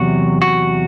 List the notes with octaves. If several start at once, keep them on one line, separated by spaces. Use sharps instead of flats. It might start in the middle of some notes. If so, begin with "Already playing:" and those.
Already playing: E2 C3 F#3 F#4
F#4